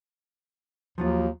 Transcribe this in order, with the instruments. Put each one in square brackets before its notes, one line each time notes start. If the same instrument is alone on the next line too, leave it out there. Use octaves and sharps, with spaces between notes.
[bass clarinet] D#2 [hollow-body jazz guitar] F3 F#3 F4